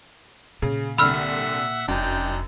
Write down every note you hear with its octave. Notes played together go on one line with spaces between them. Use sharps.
A#2 C#3
C2 D3 E5 F#5 B5 E6 F6
F1 F#2 D4 D#4 G5